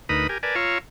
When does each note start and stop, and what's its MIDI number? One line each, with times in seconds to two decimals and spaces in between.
0.09 0.27 38
0.09 0.27 63
0.09 0.27 70
0.09 0.27 71
0.09 0.27 83
0.09 0.27 87
0.29 0.38 67
0.29 0.38 70
0.29 0.38 80
0.43 0.55 70
0.43 0.55 71
0.43 0.55 74
0.43 0.55 80
0.43 0.55 81
0.55 0.78 65
0.55 0.78 73
0.55 0.78 77
0.55 0.78 82
0.55 0.78 85
0.55 0.78 88